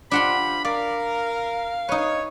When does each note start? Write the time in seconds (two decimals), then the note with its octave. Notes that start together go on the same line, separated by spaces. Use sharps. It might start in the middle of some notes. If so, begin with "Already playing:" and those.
0.11 F3 D4 G4 F#5 B5 C6
0.65 A#4 D5 F5
1.89 D#4 B4 C#5